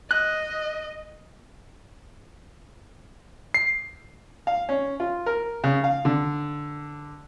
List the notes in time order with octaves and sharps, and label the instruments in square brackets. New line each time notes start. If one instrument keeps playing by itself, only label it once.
[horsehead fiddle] D#5 [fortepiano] F#6
[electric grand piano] C7
[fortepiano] F5
C#4
F4
A#4
C#3
F5
D3